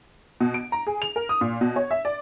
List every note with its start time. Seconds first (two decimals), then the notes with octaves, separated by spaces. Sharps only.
0.40 B2
0.54 D7
0.72 A#5
0.87 G#4
1.02 F7
1.16 A#4
1.29 D#6
1.41 A#2
1.61 B2
1.76 C#5
1.91 E5
2.05 D5